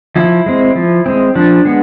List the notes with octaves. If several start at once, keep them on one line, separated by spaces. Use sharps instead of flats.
F3 E4
G#3 C4
F3
G#3 C4
F3 D4
G#3 B3